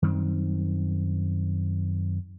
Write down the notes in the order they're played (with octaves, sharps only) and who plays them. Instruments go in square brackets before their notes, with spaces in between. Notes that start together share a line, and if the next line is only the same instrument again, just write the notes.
[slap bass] F#2 D#3 G3 C4